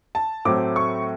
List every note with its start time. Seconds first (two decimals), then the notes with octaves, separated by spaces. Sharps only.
0.15 A5
0.45 A2 F#3 A3 C4 D6
0.76 C#6